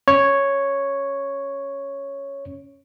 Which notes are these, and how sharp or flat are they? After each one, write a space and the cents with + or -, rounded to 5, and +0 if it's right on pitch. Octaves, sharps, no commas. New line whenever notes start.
C#4 +0 C#5 +0